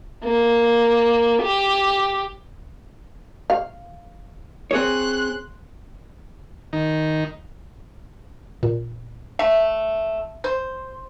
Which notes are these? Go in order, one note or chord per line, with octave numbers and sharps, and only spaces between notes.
A#3
G4
F5
C4 G#4 C#5 C6 F#6
D#3
A#2
A3 E5
C5